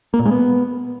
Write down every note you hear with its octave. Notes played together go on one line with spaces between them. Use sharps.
A#3
A#2
G#3
B3